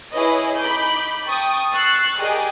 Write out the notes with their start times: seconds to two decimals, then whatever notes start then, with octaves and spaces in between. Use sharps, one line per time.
0.12 E4 G#4 B4 C#5 D#5
0.58 D#4 B5 D6 G6
1.26 G5 A5 C#6 D#6
1.72 C#6 E6 F#6 A6 C7
2.18 G4 G#4 A#4 D5 D#5